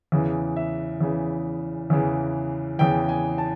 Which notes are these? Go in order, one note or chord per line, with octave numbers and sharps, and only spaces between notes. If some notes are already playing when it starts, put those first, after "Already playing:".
E2 C#3 E3
E5
E2 C#3 E3
E2 C#3 E3
E2 C#3 E3 G5
G#5
A5